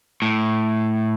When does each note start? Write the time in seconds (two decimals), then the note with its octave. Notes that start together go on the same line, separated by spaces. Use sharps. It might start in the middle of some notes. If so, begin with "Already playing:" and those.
0.22 A2